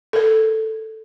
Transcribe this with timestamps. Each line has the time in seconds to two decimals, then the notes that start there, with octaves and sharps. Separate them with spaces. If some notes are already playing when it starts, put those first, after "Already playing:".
0.13 A4 A#4